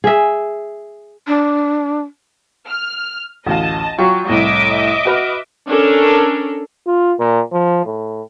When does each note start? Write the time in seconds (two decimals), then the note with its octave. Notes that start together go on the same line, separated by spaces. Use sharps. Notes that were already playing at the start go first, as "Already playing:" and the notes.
0.04 G#4 E5
1.27 D4
2.68 F6
3.47 A1 D2 D#5 F5 A5
3.99 F#3 F4 G5 C#6
4.29 C2 A2 D#5 E5 D6
5.05 F#4 B4 F6
5.67 C#4 D4 A4 A#4
6.87 F4
7.19 A#2
7.52 F3
7.86 A2